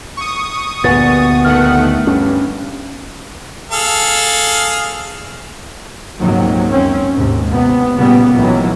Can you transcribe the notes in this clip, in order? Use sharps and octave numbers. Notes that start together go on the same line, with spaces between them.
C#6 D#6
D2 G2 A#2 B3 A6
D#3 A3 F#5 F6
G2 C#4
G#4 A4 F5
C#2 G#2 C3 D#3 F#3 A#3
F#2 C4 C#4
D#2 G#2 C3
C3 B3
A#2 C#3 G3 A#3 B3
A1 D#3 E3 F#3